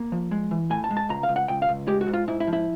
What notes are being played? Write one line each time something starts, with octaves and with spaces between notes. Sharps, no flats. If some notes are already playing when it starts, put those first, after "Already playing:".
Already playing: A#3
F3
G#3
E3
A2 G#5
A5
G#3
A5
C#2 A#5
F5
C#2
F#5
C#2 G5
F5
C#2
G#3 G4
F#4
G#2
F4
G#2 E4
E4
F3
E4